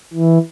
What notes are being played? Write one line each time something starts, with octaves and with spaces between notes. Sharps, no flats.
E3